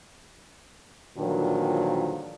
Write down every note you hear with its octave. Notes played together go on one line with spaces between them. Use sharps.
G2 A#2 D3 D#3 F3 F#3